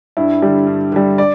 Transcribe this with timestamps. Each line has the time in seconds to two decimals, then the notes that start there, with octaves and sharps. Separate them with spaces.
0.17 G2 E4
0.42 D3 G3
0.67 G2
0.92 D3 G3
1.18 D5